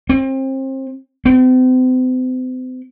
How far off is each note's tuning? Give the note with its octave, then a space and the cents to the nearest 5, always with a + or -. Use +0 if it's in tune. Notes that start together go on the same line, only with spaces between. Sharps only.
C4 +30
C4 -40